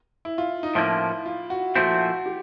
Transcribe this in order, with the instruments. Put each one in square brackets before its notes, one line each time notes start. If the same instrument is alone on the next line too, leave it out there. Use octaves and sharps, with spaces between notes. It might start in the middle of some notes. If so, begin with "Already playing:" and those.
[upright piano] E4
F4
D#4
[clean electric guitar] A2 F3 A#3 C#4 [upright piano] E4
[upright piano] F4
F#4
[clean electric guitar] A#2 F3 A3 C4 E4 [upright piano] F#4
[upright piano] G4